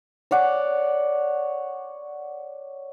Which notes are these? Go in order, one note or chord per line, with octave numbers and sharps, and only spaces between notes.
C#5 D5 F#5 D6